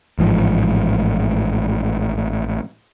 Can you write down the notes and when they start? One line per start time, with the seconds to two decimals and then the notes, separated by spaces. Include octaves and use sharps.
0.19 A1 G#2 F3